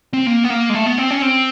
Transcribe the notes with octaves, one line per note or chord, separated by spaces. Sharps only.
C4
A#3
B3
A#3
G#3
A3
B3
C4
C#4
C4